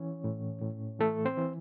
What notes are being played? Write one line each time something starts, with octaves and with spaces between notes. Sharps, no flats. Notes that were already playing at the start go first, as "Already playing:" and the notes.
Already playing: E3 C#4 C#5
A2
A2
E3 A3 A4
C4 C5
E3